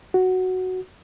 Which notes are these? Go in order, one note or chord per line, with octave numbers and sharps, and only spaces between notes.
F#4